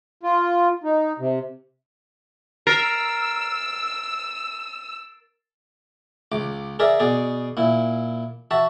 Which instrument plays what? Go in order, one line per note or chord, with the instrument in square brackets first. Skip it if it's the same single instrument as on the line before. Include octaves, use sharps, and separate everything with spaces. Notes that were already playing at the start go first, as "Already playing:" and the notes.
[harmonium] F4
D#4
C3
[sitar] A#4 [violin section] E6 [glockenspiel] A6 C7 D7
[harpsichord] C#2 D6
G#4 A#4 D5 E5
B2 G#4 D5
A#2 E4
F#4 E5 A5